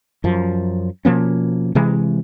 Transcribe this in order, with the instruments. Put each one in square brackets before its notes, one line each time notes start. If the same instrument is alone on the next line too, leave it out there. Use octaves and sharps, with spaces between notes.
[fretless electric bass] F#2 F3
B2 F3 A#3 C#4
C3 E3 G#3